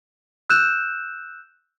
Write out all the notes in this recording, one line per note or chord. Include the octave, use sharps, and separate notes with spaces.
E6 F#6 G6 E7